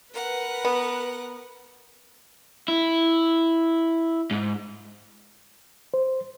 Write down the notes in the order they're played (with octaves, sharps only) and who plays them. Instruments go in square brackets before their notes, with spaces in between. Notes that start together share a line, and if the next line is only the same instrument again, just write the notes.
[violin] A#4 F#5 [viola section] B4
[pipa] B3
[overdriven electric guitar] E4
G#2
[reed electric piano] C5